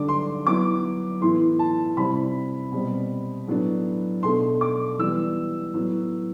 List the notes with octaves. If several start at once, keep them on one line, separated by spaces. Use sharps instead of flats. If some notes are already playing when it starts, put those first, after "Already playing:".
Already playing: D3 G3 D4 D6
C6
F#3 B3 E4 D6
A2 E3 B3 E4 C6
A5
C3 G3 C4 E4 B5
B2 G3 C4
A2 F#3 B3 D4
B2 A3 D4 C6
D6
E3 G3 B3 E6
A2 F#3 B3